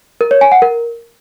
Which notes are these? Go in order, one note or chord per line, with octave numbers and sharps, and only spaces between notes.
A#4
C#5
G#5
F#5
A#4